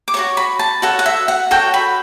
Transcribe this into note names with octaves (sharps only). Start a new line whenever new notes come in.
D6
F#4 A4 C#5 C#6
B5
A5
F#4 A4 C#5 F#5
F#5
E5
F#5
F#4 A4 C#5 G5
B5